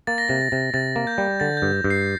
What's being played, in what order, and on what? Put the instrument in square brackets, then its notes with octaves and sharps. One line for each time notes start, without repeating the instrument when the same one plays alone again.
[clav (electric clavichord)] A#3 [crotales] A6
[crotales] A#6
[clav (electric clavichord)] C3 [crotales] A6
[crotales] A6
[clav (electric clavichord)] C3
[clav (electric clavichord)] C3 [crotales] A6
[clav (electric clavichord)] A#3
[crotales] G6
[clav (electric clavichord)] G3
[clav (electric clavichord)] D3 [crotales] A6
[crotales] G6
[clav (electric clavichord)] G2
G2
[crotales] C7